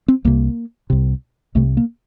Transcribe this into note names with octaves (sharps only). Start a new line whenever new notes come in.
C4
C2 C3 A#3
C2 C3
C2 C3 A3
A#3